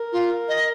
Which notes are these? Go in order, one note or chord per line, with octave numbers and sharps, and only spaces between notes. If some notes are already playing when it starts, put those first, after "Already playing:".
Already playing: A#4
F4
D#5